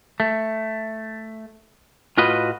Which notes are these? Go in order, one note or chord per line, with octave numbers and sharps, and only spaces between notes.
A3
A2 F4 F#4 B4 D#5